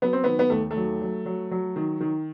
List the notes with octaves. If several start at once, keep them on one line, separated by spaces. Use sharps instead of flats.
F#3 B3
C4
D#3 B3
B3
D#2 A3
A3
F#3
F#3
F#3
F#3
D#3
D#3